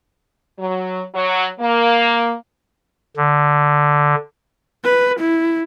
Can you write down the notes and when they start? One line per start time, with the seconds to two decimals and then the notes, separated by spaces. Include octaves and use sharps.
0.58 F#3
1.15 F#3
1.60 A#3
3.17 D3
4.84 B4
5.19 E4